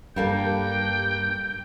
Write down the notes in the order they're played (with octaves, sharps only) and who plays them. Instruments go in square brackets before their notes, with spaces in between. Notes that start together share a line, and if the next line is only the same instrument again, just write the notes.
[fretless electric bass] G2 [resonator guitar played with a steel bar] G3 A#3 A4 [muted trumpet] G5